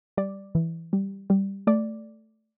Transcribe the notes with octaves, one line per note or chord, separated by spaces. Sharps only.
G3 D5
E3
G3
G3
A3 D5